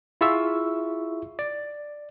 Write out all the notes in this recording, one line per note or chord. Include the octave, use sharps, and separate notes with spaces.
E4 F4 G#4 E5 C#6 E6
D5